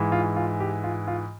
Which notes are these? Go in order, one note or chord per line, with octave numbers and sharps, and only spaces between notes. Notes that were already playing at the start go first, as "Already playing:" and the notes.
Already playing: G#2 E3 G#3
F4
F4
G4
F4
F4